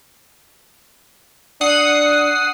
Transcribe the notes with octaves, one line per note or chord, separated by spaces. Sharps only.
D4 F#5 D#6 C7